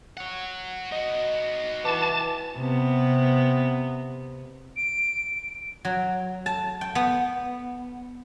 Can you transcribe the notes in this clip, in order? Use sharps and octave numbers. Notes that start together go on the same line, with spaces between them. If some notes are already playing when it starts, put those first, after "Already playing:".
C#5 F#5
D#4 F#4 D#5
E3 B4 A5 D6
C3 B3
D7
F#3
A5
G5
B3